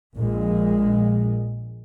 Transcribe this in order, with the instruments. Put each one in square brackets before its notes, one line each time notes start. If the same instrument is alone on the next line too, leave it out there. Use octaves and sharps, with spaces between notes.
[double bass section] A#1 A#2 G#3